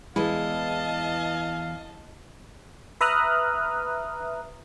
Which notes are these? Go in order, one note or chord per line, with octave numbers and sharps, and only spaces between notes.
E2 E3 G#3 E4 D#5 F5 A5
B4 E5 A#5 D#6 F6 F#6